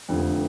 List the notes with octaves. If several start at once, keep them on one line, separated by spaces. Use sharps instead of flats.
F1 F2 D3